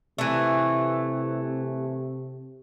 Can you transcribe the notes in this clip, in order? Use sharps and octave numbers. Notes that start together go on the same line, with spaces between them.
C3 E3 A3